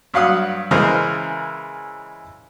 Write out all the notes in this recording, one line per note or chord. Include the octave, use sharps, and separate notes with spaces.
G2 F#3 F5 F#5 D#6
C#3 E3 G#3 A#4 C5 D#5